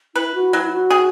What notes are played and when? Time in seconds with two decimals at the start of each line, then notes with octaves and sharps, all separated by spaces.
0.15 E4 B4
0.34 F#4
0.53 F#3 E4
0.65 E4
0.72 F#4
0.90 G#4